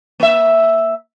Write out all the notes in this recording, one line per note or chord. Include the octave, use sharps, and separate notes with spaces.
A#3 E5